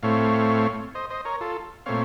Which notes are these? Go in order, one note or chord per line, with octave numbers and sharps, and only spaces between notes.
A2 A3 C4 C#5 F5
C5 D#5
C5 D#5
A#4 C#5
F4 A4
A#2 A3 C4 C#5 F5